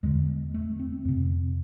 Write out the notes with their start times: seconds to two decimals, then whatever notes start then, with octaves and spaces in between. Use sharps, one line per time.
0.03 E2 D3 G#3
0.54 A3
0.79 C4
1.05 F2 C3 C4